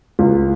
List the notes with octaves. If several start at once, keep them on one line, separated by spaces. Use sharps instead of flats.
C#2